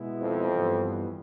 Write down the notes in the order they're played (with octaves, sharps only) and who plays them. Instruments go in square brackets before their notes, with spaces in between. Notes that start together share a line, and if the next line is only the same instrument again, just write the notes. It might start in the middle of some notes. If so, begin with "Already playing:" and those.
Already playing: [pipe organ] B2 G#3 B3 E4
[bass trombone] F2
[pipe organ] G2 E3 G3 B3